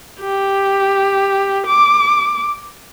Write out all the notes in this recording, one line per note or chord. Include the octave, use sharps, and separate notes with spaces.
G4
D6